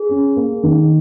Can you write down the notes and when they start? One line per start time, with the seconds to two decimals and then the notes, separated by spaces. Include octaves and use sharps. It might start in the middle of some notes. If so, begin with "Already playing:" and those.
Already playing: G#4
0.09 C#4
0.36 A#3
0.63 D#3